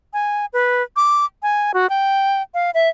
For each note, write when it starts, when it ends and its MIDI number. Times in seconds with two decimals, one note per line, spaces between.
0.13 0.46 80
0.53 0.83 71
0.96 1.25 86
1.43 1.72 80
1.74 1.87 66
1.90 2.42 79
2.54 2.71 77
2.74 2.89 76